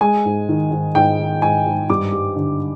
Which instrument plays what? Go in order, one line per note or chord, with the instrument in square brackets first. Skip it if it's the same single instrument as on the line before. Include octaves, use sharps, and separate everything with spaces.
[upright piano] G#3 G#5
G#2
D#3
G#2
G#2 G5
D#3
G#2 G#5
G#2
G2 D6
G3
D3